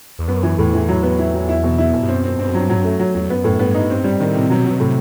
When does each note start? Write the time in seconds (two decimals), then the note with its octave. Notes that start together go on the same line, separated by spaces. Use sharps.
0.19 E2
0.28 F#2 B3
0.43 E3
0.58 E2 A2
0.73 E3
0.88 F#3
1.03 B3
1.19 E4
1.34 F#3
1.49 E4
1.64 B2
1.78 E4
1.94 B2
2.02 G2
2.08 F#2 C4
2.24 C4
2.39 G2 C4
2.48 F#2
2.55 G2 F#3
2.70 A2 F#3
2.77 G2
2.84 F#2 A3
2.99 F#3
3.15 E2 F#3
3.29 F#2 B3
3.44 A2
3.59 G2 B3
3.74 D#4
3.90 G2 C4
4.04 G3
4.20 A2 D#3
4.35 C3
4.50 B2 F#3
4.65 F#3
4.80 A2 C3